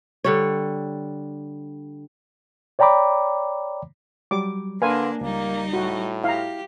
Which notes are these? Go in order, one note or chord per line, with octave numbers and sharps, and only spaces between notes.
D3 G3 C#5
C#5 D5 G5 A#5 B5 D6
F#3 G3 D6
D3 A#3 D4 A#4 B4 F5 G#5 C6
C#2 G3 A#3 D#4
A2 F#4
E4 G4 F5 A#5